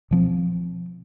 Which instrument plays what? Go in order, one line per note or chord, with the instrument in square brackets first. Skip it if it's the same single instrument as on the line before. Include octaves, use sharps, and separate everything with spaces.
[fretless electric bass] B2 F3 C4